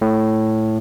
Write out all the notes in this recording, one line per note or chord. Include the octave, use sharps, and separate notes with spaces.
A2